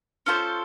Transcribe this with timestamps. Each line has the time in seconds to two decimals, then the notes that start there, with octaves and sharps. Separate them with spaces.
0.26 C#4 F4 A4 C5